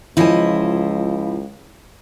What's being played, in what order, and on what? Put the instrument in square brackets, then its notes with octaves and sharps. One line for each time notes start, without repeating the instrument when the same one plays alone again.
[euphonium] C#2 [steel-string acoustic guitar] F3 D#5 [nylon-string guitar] E4 C#5 G#5